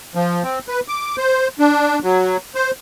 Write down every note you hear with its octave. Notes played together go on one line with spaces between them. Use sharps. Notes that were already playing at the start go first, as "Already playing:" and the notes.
F3
C4
B4
D6
C5
D4
F#3
C5